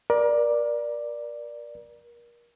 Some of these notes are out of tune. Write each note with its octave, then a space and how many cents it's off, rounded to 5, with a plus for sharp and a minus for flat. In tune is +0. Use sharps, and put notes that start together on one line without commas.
A#4 +30 D5 +5